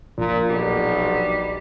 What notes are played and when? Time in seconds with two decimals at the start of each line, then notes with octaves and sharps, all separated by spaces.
0.18 A#1 A#2
0.50 B1 G3